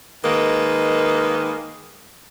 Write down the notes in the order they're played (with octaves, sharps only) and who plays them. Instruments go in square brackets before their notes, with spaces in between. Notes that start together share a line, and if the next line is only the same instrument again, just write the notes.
[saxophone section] D#3 G#3 A#3 B4